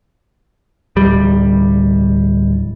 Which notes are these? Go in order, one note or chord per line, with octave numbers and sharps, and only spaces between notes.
D1 G3